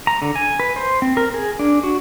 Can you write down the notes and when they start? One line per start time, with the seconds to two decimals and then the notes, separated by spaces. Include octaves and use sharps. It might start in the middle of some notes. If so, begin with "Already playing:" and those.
0.07 A#5
0.22 D3
0.35 G#5
0.60 B4
0.76 C5
1.02 C4
1.17 A#4
1.34 G#4
1.59 D4
1.83 F#4